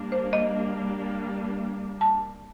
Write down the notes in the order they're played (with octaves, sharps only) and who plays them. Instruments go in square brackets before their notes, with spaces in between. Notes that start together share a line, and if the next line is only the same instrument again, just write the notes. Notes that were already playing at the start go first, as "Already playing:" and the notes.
Already playing: [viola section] G3 A#3 D4
[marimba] C5
D#5
A5